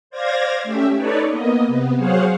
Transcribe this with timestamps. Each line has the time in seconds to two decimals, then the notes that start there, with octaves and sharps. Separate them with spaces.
0.10 C5 D5 F5 G#6 A#6
0.64 A3 C#4 G4 E5
0.96 D#4 A4 B4 C#5 D5
1.28 A#3 B3 D#5
1.67 C3 B3
1.97 F#3 G#4 C5 C#5 F5 F#5